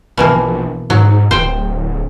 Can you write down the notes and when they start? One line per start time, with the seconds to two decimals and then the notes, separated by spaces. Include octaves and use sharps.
0.18 A#1 B2 E3 A#3
0.90 G#2 F#3
1.31 D1 C5 G5